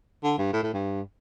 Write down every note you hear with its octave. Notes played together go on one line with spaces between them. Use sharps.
D3
G2
A2
A2
G2